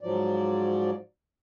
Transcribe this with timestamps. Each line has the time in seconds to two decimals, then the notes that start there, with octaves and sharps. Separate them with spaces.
0.01 G#2 F3 F#3 D5